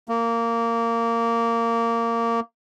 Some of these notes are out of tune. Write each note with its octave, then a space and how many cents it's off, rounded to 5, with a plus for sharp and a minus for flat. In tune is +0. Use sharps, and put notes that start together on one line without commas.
A#3 -15